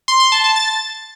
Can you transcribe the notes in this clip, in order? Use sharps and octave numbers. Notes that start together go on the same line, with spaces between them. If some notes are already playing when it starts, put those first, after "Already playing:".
C6
C6
A5
A5
A6